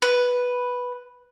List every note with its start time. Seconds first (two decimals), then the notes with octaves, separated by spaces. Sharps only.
0.02 B4